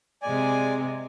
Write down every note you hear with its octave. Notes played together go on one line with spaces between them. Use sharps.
C3 G#3 D5 G#5